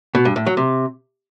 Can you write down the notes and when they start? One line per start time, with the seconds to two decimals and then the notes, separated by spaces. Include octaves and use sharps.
0.15 B2
0.25 G2
0.36 A2
0.46 F#3
0.57 C3